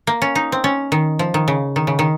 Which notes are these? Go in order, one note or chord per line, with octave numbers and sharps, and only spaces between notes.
A#3
C#4
D#4
C4
C#4
D#3
F3
D#3
C#3
D#3
C#3
D#3